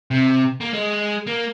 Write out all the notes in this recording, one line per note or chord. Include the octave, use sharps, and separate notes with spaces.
C3
A#3
G#3
A#3